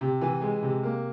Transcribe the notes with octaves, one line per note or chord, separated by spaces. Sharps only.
C3
E3
G#3
C3
A#3